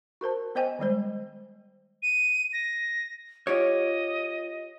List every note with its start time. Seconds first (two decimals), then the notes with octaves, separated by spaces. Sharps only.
0.21 F#4 A#4 C5 A5
0.55 B3 C5 D#5 G5 G#5
0.79 D#3 G3 G#3 C5
2.03 D#7
2.53 A#6
3.47 F4 G4 C#5 D#5